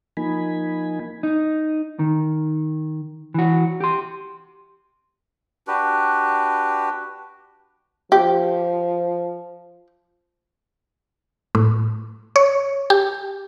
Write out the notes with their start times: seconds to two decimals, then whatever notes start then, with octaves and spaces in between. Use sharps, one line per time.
0.17 F3 A#3 D#4 G#5 B5
1.23 D#4
1.99 D#3
3.34 E3 F#4
3.80 G4 C6
5.67 D4 F#4 G4 B4
8.12 F3 G4
11.55 A2
12.36 C#5
12.90 G4